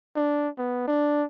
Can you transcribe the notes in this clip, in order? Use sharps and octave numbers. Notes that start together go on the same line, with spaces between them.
D4
B3
D4